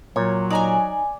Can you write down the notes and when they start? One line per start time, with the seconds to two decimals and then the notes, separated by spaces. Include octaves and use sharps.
0.16 A#2 F#3 C#5
0.50 D#4 D5 G#5 A#5